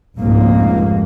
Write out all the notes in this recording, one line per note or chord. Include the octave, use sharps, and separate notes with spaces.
F1 C#2 G#2 A#3